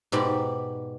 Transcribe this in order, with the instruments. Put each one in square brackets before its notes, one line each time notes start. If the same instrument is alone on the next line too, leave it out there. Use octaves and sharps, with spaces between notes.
[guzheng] G#2 B2 G4 D5 B5